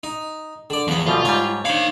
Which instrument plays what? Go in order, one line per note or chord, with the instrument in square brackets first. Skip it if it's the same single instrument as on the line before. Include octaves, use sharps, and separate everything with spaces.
[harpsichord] D#4
D3 D5
[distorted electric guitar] E2 [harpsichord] F3 B3
[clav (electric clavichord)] D2 B2 G3 [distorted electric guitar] F4
[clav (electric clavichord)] G#2 G3 [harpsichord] C#5
[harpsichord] D4 B5 [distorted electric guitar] D#4 F5 [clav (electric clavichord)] C5 C#5